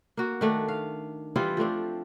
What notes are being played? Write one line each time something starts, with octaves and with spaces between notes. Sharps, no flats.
A#3 F#4
D#3 A3 D4
F5
E3 G3 E4 F4
F3 A3 C4 D4